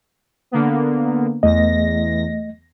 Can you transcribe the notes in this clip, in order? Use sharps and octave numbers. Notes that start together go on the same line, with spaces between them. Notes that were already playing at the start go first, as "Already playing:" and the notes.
D3 A#3 B3
E2 A3 D#5 A#6